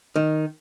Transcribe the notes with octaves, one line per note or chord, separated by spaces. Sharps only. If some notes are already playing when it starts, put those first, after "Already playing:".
D#3